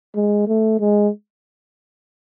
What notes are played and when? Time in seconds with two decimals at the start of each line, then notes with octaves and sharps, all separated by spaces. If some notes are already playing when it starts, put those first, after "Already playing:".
0.15 G#3
0.48 A3
0.80 G#3